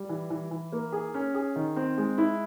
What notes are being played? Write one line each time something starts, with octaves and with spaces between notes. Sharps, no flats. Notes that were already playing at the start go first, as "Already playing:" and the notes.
Already playing: G3
E3
E3
E3
A#3
G#4
C#4
G#4
D#3
C4
G#3
E4